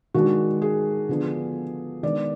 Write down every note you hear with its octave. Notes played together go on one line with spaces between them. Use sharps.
D#3 G#3 D4 F#4
G#4
D3 F3 B3 D4
D#3 G#3 B3 D4 D5